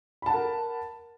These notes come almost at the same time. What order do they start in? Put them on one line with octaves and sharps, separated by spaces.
B5 A5 F#5 A#4